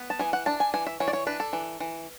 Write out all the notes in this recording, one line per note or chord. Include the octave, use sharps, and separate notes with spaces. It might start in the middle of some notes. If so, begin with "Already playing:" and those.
Already playing: B3
A5
E3 G#5
F#5
D4 A5
G#5
E3 G#5
E5
E3 C#5
D5
C#5
D4 B4
A4
E3
E3